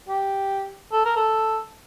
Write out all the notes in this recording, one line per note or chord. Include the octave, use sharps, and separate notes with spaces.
G4
A4
A#4
A4